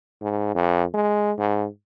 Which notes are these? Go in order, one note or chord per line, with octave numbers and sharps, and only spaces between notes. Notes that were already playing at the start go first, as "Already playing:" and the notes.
G#2
F2
G#3
G#2